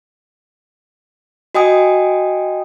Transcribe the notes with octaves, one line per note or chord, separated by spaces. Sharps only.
F#4 D#5 G5 G#5 D#6